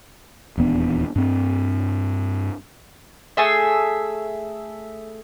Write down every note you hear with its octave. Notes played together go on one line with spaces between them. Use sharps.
D#1 E2 B3 D4
G2 C4
A3 G#4 E5